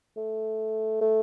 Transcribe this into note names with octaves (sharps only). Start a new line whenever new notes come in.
A3
A3